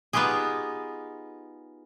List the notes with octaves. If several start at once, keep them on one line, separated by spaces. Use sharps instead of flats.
B3 D#4 F4 G4 G#4